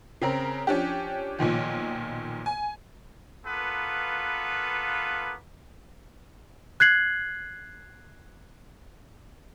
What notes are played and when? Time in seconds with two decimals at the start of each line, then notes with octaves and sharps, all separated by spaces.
0.22 C#3 C4 A#4
0.67 F3 C#4 D4 G4
1.39 B1 A#2 D#3 F3
2.46 G#5
3.46 A#3 B3 F4 A4 B4
6.80 F#6 G#6 C7 F#7